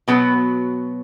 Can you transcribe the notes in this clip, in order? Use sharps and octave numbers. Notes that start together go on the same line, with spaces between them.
B2 F#3 B3